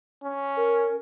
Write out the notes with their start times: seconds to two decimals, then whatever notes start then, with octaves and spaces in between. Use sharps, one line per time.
0.24 C#4
0.57 A#4